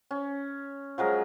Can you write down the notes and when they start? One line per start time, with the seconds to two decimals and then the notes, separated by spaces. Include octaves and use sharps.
0.11 C#4
0.98 F3 F#3 G#3 A#4